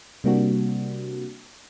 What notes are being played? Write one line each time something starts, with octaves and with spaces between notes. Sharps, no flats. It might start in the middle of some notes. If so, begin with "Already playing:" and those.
C3 G3 A#3 C4 D4 F#4